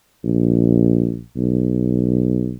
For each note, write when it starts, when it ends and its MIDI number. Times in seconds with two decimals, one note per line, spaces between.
0.24 1.20 34
1.36 2.56 35